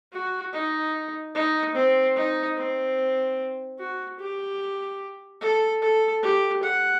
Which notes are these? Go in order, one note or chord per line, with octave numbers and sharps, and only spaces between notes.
F#4
D#4
D#4
C4
D#4
C4
F#4
G4
A4
A4
G4
F#5